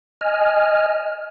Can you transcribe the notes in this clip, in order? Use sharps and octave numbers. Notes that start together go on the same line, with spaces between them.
D#5 G#5 F6